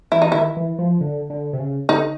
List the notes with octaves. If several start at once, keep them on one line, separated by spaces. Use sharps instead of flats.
E3 E4
D#4
D#3 E4
E3
F3
D3
D3
C3
C#3
D3 D#4